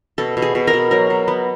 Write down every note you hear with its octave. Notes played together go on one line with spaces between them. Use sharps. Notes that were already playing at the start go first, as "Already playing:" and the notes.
B2 A4
B2
G#4
B2
A#4
B2
F#3 A#4
B2
B3